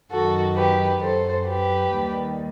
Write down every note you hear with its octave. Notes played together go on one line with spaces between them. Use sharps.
F#2 D#3 F#3 F#4 A4
G4 B4
F#2 F#3 A4 C5
G4 B4
D#2 D#3 G3